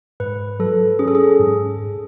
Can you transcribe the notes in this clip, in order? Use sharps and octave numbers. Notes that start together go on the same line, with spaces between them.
G#2 B4
F#3 A4
C#4 G#4
A4
G#4
G#2
G#2